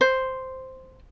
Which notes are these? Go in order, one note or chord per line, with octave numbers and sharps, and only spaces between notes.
C5